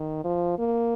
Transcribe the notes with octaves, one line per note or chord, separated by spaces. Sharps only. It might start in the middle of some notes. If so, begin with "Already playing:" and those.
Already playing: D#3
F3
A#3